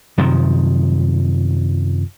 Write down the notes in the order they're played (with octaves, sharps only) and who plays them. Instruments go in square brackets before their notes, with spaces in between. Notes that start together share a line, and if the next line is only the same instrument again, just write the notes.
[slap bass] F#2 C3 D#3 F3